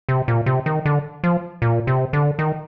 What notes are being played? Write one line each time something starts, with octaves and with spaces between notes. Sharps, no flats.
C3
A#2
C3
D#3
D3
F3
A#2
C3
D3
D#3